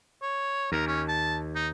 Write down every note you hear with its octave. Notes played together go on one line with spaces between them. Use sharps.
C#5
D#2 A#4
C#4
A5
D#4